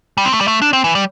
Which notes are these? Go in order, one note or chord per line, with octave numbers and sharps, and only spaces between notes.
G3
C4
A3
G3
A3
D4
C4
E3
G3